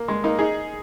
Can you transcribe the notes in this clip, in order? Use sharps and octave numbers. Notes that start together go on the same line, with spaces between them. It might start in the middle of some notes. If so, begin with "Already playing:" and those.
Already playing: A#3
G#3
A#3 D#4
D#4 G#4